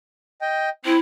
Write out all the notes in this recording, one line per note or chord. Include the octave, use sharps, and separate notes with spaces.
D#5 G5
C4 E4